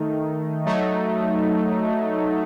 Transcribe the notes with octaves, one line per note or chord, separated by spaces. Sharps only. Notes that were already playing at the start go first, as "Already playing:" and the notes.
Already playing: D#3 A3 D#4
F#3 A3 D#4